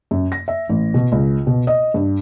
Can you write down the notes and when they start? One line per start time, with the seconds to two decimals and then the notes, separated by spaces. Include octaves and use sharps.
0.11 F#2
0.32 A#6
0.48 E5
0.69 A1
0.94 B2
1.12 C#2
1.47 B2
1.67 D#5
1.94 G2